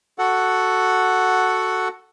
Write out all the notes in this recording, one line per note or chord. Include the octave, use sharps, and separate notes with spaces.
F#4 A4 F#5